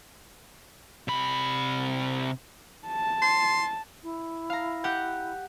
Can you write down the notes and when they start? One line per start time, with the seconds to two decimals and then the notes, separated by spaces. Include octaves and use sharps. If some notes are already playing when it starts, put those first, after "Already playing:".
1.08 C3 B5
2.87 A5
3.22 C6
4.03 E4
4.50 F5 A#5
4.84 G4 F#5 G6